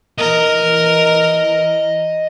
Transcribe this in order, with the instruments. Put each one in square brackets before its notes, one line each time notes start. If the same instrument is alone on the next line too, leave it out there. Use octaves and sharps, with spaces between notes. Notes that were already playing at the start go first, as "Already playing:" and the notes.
[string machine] E3 A#5 [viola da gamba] A#4 [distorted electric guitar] D#5